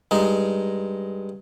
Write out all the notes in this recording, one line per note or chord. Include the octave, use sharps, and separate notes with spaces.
G2 G#3 D#4